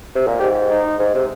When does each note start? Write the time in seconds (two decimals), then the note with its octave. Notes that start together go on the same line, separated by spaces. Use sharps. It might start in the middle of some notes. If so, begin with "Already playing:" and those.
0.15 C3
0.27 A#2
0.39 G#2 G4
0.69 D#4
0.99 G#2
1.14 C3